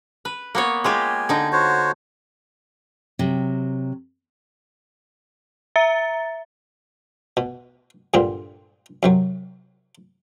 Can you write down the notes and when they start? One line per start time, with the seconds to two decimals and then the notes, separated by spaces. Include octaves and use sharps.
0.25 B4
0.55 A#3 B3 C#5
0.84 G#3 F4 G4 G#5
1.29 D3 D#4
1.52 F#4 C5 C#5
3.19 C3 F#3
5.76 E5 A#5 A6
7.37 B2
8.14 G2 A#2 D3 C4
9.03 F#2 C3 F#3